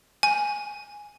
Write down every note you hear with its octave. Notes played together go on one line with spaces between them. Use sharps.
G#5